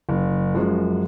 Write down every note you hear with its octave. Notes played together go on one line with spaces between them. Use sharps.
F#1
F#2 F3 G#3